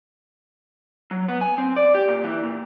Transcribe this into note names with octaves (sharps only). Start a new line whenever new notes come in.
F#3
B3
G#5
C4
D5
G4
A#2
E3
A#2